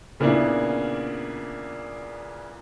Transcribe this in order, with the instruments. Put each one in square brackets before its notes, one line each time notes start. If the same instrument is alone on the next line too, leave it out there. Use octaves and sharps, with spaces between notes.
[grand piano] A#2 C#3 A#3 B3 D4 E4